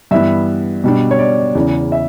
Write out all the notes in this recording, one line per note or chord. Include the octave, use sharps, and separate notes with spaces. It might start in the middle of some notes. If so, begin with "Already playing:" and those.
G2 E3 B3 E5
B2 G3 D4
C#5
D5
E2 C#3 E3
E5